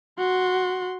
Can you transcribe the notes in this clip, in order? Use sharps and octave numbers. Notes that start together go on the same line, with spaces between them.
F#4 C6